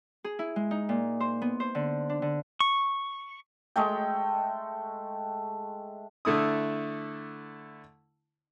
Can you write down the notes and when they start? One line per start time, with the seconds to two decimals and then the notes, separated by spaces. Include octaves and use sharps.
0.24 G#4
0.39 E4
0.56 G#3
0.71 D#4
0.89 A#2
1.20 C5
1.42 B3
1.60 C5
1.75 D3
2.09 D4
2.22 D3
2.60 C#6
3.76 G#3 A3 G5
6.25 D3 A3 E4 D#6